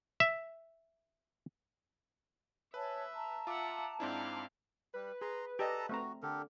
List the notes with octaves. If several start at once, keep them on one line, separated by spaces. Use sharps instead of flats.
E5
B4 C#5 E5 G#5 A5
A5 A#5
F4 E5 F#5 D6
G#2 C4 D4 E4 F5
G3 B4
G#4 A#5 C6
G4 A4 D5 D#5 A5 A#5
A3 C4 F#4 A#5
D3 G4 A4 A#4